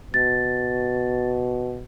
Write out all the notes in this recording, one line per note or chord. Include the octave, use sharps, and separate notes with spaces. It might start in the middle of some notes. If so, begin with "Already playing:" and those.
B2 A6